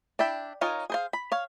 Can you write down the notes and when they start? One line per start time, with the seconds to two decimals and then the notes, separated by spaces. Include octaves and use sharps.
0.19 D4 E4 E5 G5
0.61 D#4 F4 A#4 C#5 G#5
0.90 G#4 C5 F5
1.13 B5
1.32 C#5 F5